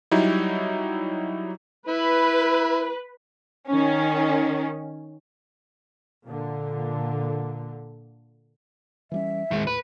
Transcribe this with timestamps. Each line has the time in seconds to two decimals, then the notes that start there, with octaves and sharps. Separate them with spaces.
0.11 F#3 G3 D#4 E4
1.88 E4 B4
3.69 D#3 C#4
6.26 A#2 D3
9.12 E3 G3 C#4 E5
9.51 D#2 A2 D#3 G#3
9.67 B4